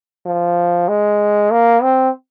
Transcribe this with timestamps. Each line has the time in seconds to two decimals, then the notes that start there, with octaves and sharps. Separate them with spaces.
0.26 F3
0.88 G#3
1.51 A#3
1.82 C4